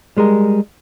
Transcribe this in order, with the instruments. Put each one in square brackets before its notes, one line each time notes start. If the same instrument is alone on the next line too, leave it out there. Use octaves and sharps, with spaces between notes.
[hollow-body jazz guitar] G3 G#3 G#4 A#4